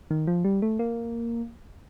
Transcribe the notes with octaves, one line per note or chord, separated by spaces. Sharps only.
D#3
F3
G3
A3
A#3